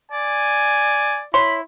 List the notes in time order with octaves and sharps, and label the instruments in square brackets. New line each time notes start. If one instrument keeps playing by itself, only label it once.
[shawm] D5 [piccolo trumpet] G#5
[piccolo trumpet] E4 [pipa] C#5 C6 [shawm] B5